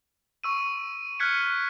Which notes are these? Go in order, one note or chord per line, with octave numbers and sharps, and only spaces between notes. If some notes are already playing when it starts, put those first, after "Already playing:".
C#6 E6 D#7
F6 F#6 G#6 B6 C#7 D#7